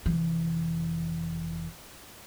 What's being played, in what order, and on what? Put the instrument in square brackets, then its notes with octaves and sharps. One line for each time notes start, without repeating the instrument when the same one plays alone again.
[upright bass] F1 E3